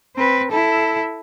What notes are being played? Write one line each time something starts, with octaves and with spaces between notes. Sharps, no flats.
C4 B4
E4 A4